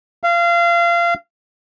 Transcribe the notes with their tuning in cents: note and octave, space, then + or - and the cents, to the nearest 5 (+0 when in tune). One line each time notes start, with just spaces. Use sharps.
F5 -25